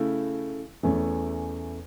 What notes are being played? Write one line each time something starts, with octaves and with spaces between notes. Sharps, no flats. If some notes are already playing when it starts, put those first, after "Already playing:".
Already playing: C#3 A3 E4
E2 E3 A3 C#4